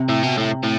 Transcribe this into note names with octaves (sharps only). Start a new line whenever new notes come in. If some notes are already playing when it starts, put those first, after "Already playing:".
Already playing: C3
A2
B2
A2
A2